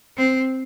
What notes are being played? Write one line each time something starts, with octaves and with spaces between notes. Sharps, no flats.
C4